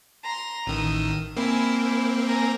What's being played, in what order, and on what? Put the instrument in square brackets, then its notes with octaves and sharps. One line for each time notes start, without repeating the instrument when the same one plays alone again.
[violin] A#5 C6
[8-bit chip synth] A1 D#3 [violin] D#6 E6
[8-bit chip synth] A#3 C4 [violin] E4 G#5
[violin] G#5 A#5